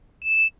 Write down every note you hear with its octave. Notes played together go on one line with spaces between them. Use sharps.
E7